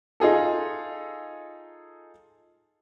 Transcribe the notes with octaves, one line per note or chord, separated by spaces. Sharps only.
D#4 F4 G#4 A4